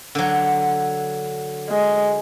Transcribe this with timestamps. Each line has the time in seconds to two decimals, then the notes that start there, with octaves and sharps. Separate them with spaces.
0.15 D3 F#3
1.70 G#3